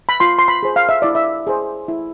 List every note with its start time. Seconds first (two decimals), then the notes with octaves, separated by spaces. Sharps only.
0.09 B5
0.20 F4 C6
0.39 C6
0.48 B5
0.63 G#4 C5
0.76 F5
0.89 E5
1.02 E4 D5
1.15 E5
1.47 G#4 C5
1.88 E4